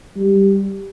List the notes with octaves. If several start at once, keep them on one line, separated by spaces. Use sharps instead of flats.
G3